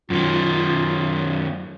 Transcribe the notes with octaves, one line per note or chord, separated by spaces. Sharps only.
F#2 D#3 F4